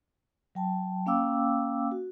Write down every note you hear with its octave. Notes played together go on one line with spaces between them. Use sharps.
F#3 G5 A5
A#3 C#4 F5 G5 D6 E6
F#4